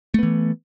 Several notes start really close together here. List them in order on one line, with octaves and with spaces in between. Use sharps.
A3 B3 E3